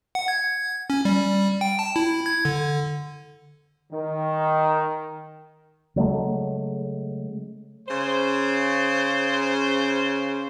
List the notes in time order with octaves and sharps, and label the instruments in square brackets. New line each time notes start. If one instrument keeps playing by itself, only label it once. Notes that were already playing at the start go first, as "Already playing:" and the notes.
[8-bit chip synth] F#5
G#6
C#4
G3
G5
A5
E4
G#6
D3
[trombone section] D#3
[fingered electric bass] C#3 F#3 G#3 A3
[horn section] C#3 C5